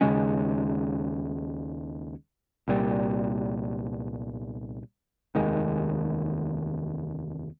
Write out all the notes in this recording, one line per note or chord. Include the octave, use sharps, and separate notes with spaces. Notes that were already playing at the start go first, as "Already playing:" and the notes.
D#2 C#3 G#3 C#4
C2 A#2 G3
F1 D#2 D#3 G#3